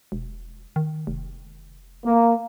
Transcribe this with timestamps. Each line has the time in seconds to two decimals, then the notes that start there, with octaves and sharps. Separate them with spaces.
0.12 E1
0.76 D#3
1.07 F1
2.05 A#3